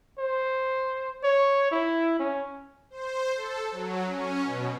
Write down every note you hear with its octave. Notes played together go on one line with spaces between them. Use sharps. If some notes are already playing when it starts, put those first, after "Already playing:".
C5
C#5
E4
C#4
C5
A4
F#3
C#4
B2